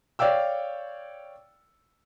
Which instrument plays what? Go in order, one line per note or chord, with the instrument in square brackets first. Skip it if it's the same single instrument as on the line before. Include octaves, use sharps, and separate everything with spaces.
[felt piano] C#5 D5 F5 G5 E6